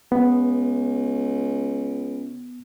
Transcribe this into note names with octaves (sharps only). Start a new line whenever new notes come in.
C#2 B3